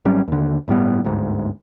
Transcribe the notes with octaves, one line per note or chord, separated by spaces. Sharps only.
G#1 F#3 G3 C#4
D#2 D3
G1 A2 G3 B3
G1 D2 G#2